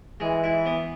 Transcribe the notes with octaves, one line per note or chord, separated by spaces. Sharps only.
E3 G#3
E4
B3